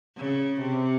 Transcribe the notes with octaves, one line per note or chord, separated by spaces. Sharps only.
C#3
C3